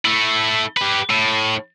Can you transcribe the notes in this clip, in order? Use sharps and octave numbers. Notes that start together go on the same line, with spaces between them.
A3 E4
G4 B4
A2